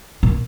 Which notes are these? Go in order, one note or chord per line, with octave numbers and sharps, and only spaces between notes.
A#2